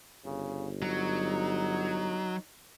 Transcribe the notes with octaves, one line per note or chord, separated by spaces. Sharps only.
G1 C#3
F#3 D#4